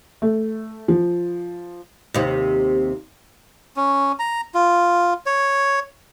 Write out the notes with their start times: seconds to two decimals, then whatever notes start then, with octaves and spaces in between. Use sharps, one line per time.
0.22 A3
0.88 F3
2.14 D#2 C3
3.77 C#4
4.19 A#5
4.54 F4
5.26 C#5